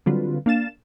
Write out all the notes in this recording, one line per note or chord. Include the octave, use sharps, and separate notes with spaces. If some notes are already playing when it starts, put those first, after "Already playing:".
D3 F#3 G3 C4 F4 B4
A#3 D4 F5 A6 E7